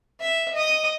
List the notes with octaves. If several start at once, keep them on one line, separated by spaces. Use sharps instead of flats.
E5
D#5 D#6